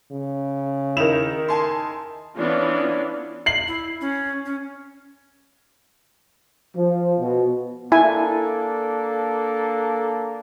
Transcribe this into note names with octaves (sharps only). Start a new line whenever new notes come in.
C#3
D#3 E4 E7 F7
G#5 A5 C6
E3 B3 C#4 D4 F4
C7 F#7
E4
C#4
C#4
F3
B2
A#3 D4 E4 A4 G#5